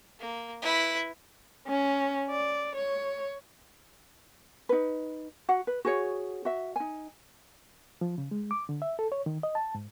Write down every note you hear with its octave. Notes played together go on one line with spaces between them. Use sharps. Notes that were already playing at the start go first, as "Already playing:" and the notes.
A#3
E4 B4
C#4
D5
C#5
D#4 B4
F#4 F#5
B4
F#4 G#4 C#5
F#4 E5
D#4 G#5
F3
C#3
G#3
D6
D3
E5
A4
C#5
D#3
D#5
A5
G#2